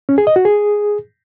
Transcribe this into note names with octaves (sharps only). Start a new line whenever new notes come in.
C#4
G#4
D#5
F#4
G#4